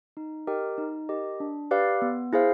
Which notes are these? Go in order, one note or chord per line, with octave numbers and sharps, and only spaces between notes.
D#4
G4 A#4 D#5 G5
D#4
G4 A#4 D#5
D4
G4 B4 D5 F5
B3
E4 G#4 C5 F5